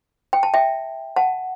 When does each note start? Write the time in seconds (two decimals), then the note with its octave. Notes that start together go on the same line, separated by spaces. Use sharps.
0.33 G5
0.43 A5
0.54 E5 G5
1.16 F#5 A5